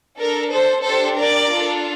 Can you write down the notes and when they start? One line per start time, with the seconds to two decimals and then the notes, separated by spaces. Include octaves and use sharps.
0.19 D4 A4 A#4
0.51 A4 C5
0.84 D4 G4 A4 C5
1.18 A#4 D5
1.51 D4 F4 A4